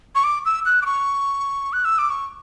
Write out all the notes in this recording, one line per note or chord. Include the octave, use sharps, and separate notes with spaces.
C#6
D6
E6
F#6
D6
C#6
F#6
E6
D6
C#6